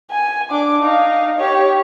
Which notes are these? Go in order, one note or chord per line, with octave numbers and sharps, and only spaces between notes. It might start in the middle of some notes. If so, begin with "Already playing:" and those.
G#5
D4 D6
D#4 F5
G4 C#5